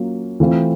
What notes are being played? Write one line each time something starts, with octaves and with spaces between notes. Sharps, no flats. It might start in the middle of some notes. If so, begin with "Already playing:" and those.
Already playing: F#3 A#3 C#4 F4
E3 A3 C4 F4